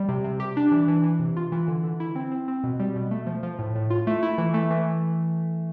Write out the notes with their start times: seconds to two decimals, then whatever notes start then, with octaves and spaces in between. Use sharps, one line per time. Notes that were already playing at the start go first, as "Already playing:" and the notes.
Already playing: G3
0.09 C3
0.24 C3
0.40 G4
0.57 D4
0.72 E3
0.88 E3
1.04 E3
1.20 C3
1.37 F4
1.52 E3
1.68 D3
1.84 D3
2.00 E4
2.15 C4
2.32 C4
2.48 C4
2.64 B2
2.79 G3
2.96 B2
3.11 A3
3.27 F3
3.43 F3
3.59 A2
3.76 A2
3.90 F4
4.07 A3
4.23 E4
4.38 E3
4.54 A3
4.71 E3